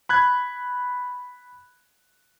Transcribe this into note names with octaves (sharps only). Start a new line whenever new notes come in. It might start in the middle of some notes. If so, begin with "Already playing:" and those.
B5 F#6 G#6